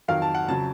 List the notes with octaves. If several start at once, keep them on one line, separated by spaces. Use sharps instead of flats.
F2 D#3 F#3 F5
A5
F#5
F2 C#3 F#3 A5